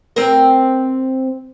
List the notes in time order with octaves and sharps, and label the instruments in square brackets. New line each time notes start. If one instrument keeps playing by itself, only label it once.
[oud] C4 A#4